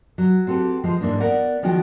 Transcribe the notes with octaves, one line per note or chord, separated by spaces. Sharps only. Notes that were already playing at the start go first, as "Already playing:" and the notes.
F#3
C4 F#4 G4 A4 B4
F3 G#3
G#2 E3 A#3 D4
B3 A#4 D5 F#5
D#3 F3 G#3 C#4 F#4 G5